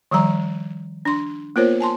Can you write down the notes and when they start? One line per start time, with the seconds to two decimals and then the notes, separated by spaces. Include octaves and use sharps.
0.11 D#3 F3 G3 A#5
1.05 D4 C6
1.56 A#3 B3 F4 A#4 C5 C#5
1.80 G#5 A5 C6